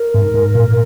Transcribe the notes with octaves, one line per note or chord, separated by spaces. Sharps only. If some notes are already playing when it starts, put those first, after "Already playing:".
Already playing: A#4
G#2
G#2
A#2